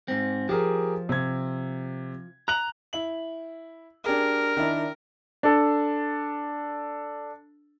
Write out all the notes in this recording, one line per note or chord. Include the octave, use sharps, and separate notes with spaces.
G#2 C4
F3 G4 G#4 A#4
C3 G#6
A#5 F#6 F#7
E4 F#7
D4 G4 G#4 A#4
D#3 D4 E4
D4 A4